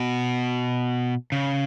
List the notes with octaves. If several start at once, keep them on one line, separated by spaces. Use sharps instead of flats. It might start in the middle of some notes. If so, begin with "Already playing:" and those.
Already playing: B2
C#3